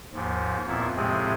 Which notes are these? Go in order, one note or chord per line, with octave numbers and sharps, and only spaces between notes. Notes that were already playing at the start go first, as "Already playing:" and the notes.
D#2 G#2 F3
F2 A#2 A#3 B3 E4
A2 C3 F3 G#3 C4 G#4